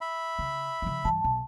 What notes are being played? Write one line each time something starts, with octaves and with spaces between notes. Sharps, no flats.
E5 B5
C#3
C#3 F3
G2 E3 A5
B1